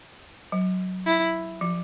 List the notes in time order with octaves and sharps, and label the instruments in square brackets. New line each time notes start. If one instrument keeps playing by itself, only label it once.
[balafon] F#3
[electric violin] E4
[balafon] F3